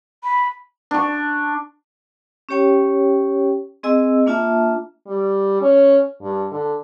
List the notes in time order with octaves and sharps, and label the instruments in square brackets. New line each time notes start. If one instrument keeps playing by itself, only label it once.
[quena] B5
[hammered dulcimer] D4 C#6
[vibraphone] C#4 G4 C#5 G5
C4 G#4 D#5 G#5 E6
A#3 D4 F4 E5 A5
[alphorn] G3
C#4
G2
D3